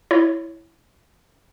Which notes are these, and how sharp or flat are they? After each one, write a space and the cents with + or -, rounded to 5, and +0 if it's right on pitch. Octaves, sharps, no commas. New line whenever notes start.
E4 +0 C#5 +0